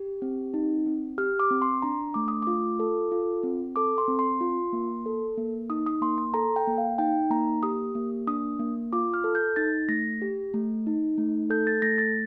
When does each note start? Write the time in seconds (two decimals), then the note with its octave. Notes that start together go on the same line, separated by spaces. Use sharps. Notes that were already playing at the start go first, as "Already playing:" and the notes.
Already playing: G4
0.22 C4
0.54 D#4
0.86 C4
1.18 G4 F6
1.39 D6
1.51 C4
1.62 C6
1.82 D4 A#5
2.14 A3 D6
2.28 D#6
2.42 F4 D6
2.80 A4
3.12 F4
3.43 C4
3.76 A4 D6
3.98 C6
4.08 C4
4.19 C6
4.41 F4
4.73 A#3
5.06 A4
5.38 A#3
5.70 D#4 D#6
5.86 D#6
6.01 A#3 C6
6.18 C6
6.34 A4 A#5
6.56 G5
6.67 A#3
6.78 F5
6.98 D#4 G5
7.30 A#3 A#5
7.63 G4 D#6
7.95 A#3
8.27 D4 D#6
8.59 A#3
8.93 F4 D6
9.14 F6
9.24 A4
9.35 G6
9.56 D#4 A6
9.89 A3 A#6
10.22 G4
10.54 A3
10.86 D#4
11.18 A3
11.50 A4 G6
11.67 A6
11.82 A3 A#6
11.98 A6